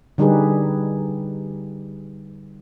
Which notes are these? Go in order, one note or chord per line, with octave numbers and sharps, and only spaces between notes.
D3 G3 D#4 G4 G#4 B4